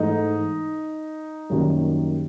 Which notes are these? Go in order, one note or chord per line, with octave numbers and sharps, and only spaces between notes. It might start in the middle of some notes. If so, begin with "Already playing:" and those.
Already playing: G#2 E3 A3 D#4
F#2 D#3 G3 A#3